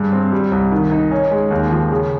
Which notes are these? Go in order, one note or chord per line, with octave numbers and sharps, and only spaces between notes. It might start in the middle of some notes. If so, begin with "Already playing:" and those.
Already playing: G2 G#4
C4
G3
C2
D#3
D#4
C#4
G#3
D#2
F3
C#3